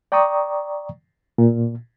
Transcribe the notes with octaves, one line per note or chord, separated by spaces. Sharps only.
D5 G5 A#5 C#6 D#6
A#2